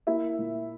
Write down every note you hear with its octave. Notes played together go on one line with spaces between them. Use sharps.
A#3 E4 E5
A#2